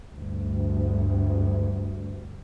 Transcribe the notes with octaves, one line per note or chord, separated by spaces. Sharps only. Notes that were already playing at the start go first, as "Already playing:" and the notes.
D2 G2